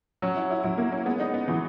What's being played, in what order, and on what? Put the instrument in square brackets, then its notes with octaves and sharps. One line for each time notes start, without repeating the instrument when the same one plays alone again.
[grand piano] F#3 [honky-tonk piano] C#4
[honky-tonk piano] E4
E4
[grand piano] F#3 [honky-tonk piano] E4
[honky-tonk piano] A#3
C#4
[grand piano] G#3 [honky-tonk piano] B3
[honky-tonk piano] D#4
B3
[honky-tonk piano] E3 [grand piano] F#3